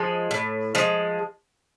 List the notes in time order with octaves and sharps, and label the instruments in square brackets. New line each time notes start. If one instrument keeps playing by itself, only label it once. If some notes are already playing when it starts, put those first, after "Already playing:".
Already playing: [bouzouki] F3 G#3
A2
F3 G#3